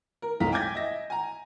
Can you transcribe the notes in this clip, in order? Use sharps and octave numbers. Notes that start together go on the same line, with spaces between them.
A#4
B1 F2 G#3 F5 A#5 B6
G5 G#5 D6 G6 G#6 A#6
D#5 E5 A#6
G#5 A#5